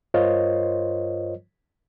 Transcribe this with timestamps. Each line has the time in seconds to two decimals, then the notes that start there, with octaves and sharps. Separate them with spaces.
0.14 G2 F4 A#4 C5 C#5 D#5